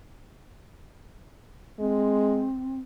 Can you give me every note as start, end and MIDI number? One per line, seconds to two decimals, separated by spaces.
1.80 2.47 56
1.80 2.80 60